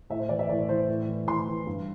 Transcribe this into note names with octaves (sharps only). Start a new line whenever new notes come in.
A2 E5
C5
E3 D5
E5
A2 D5
E3 C5
A2
E3
A2 C6
E3
G2